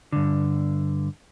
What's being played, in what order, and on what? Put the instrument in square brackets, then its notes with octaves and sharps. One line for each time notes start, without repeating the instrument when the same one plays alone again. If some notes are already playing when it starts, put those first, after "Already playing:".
[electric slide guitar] G2 D3